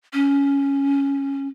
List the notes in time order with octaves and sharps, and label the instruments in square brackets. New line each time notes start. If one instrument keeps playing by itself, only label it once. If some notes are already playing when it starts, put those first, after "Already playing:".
[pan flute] C#4